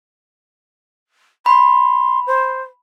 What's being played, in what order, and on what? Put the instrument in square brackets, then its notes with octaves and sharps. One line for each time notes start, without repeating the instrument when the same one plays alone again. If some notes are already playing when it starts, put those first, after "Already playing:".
[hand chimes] B5 [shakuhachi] C6
[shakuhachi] C5